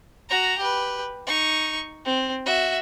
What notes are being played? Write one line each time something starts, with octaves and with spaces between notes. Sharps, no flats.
F#4 A#5
G4 B4
D#4 C#6
C4
F#4 E5